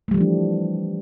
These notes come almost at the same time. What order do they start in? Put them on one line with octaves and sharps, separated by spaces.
A3 G3 F3 E3 D4